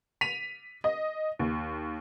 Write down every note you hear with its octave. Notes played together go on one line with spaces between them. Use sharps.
B6 D#7 F7
D#5
D#2